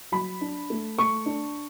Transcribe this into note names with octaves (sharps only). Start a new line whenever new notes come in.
F#3 B5
D4
A3
A3 C#6
D4